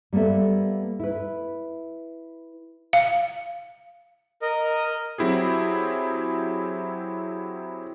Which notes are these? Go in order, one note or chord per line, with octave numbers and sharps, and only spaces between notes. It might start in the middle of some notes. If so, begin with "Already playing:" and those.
G3 A#3 B3 A4 E5
E4 B4
F5
A#4 D#5
F#3 C4 E4 G4 G#4